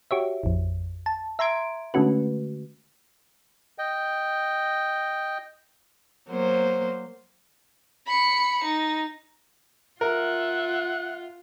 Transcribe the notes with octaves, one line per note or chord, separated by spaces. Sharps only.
F#4 G4 C#5 E5
A1 F2
A5
E5 A#5 C6 G#6 D7
D3 G#3 A3 C#4 F#4 B4
D#5 G5
F#3 A#3 C5
B5 C#7
D#4
F4 A#4 E5 F#5